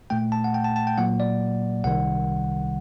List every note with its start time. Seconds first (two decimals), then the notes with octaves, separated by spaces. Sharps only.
0.10 A#2 A3 G5
0.32 A5
0.44 F#5
0.54 G5
0.64 A5
0.76 A5
0.87 G5
0.98 A#2 F#3 A#3 F#5
1.20 D5
1.84 C2 C3 D#3 G3 F#5